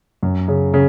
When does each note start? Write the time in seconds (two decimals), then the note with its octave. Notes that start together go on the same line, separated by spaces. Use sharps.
0.23 F#2
0.48 C#3
0.74 C#3